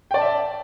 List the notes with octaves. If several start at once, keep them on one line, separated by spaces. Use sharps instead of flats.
D5 E5 G5 A5